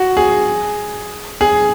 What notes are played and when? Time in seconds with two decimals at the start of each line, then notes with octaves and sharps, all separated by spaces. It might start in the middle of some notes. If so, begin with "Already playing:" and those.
Already playing: F#4
0.17 G#4
1.41 G#4